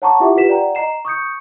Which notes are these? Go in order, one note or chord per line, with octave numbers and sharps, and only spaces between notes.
C#5 F#5 A5 A#5 C#6 D6
E4 F4 G4 E5 F#5 D6
F4 G4 B4 B6 E7
D5 F#5 G5 A#5
D#5 A#5 C7 E7
C#6 D#6 G6 C#7